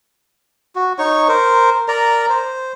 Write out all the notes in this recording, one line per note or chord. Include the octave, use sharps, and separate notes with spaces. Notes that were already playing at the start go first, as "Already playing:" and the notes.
F#4
D#4 C#5 C#6
A#4 C5
A#4 D5 A#5
C5